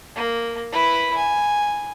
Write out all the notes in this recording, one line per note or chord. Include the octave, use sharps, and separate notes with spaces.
A#3
E4 B4
G#5